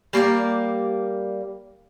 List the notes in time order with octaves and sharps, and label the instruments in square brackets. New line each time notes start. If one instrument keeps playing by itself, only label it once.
[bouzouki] G3 A#3 A#4 D5